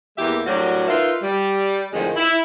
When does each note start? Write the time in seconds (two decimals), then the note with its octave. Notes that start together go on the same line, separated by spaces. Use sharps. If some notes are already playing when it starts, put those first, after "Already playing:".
0.18 E2 E3 G#3 A#3 G4 E5
0.46 A2 F#3 G3 D4 F#4 A#4
0.88 D#4 F4 A#4 B4 E5 F5
1.22 G3
1.93 F2 A2 D3 D#3 F3 G#3
2.17 E4